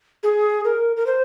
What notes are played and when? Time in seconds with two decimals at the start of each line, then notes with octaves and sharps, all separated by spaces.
0.23 G#4
0.65 A#4
0.96 A#4
1.06 C5